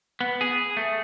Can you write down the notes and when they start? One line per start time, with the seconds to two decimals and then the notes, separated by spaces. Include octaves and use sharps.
0.21 B3
0.41 G#4
0.77 A3